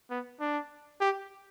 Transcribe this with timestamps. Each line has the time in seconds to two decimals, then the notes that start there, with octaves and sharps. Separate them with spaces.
0.10 B3
0.40 D4
1.01 G4